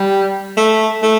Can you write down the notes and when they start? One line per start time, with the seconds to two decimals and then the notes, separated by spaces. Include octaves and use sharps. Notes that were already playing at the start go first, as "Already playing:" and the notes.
Already playing: G3
0.57 A3
1.02 A3